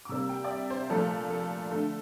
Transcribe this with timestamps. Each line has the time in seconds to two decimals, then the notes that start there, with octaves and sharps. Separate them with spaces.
0.05 D6
0.09 C3 G3 A#3 E6
0.29 G5
0.44 D5
0.50 E5
0.70 C5
0.90 A#2 F3 A3 A4
1.30 A4
1.71 D3 A3